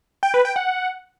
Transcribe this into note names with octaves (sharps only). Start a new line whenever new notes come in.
G5
B4
G5
F#5